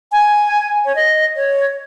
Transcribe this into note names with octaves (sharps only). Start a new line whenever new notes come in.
G#5
C#5
D#5
C#5